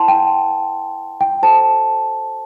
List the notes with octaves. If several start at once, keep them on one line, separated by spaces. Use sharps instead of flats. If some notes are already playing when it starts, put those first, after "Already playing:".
Already playing: E4 B4 D5 F#5 A5 C6
G5
G5
F#4 A4 C5 A5